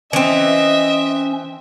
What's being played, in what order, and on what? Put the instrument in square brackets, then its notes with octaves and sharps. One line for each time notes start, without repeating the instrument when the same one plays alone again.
[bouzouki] E3 C4 [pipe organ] C#4 [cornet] D#5 [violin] E5